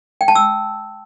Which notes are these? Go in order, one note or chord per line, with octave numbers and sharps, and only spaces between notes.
G5
A5
E6